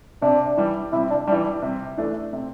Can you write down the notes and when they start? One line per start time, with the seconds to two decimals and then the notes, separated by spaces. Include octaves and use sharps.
0.22 C3 D4
0.57 E3 G3
0.92 C3 E4
1.10 D4
1.27 E3 G3 D4
1.62 C3
1.97 E3 A3 D4
2.33 C3